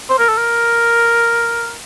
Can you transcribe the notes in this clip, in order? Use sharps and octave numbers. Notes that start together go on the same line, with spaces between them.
C5
A#4
A4
A#4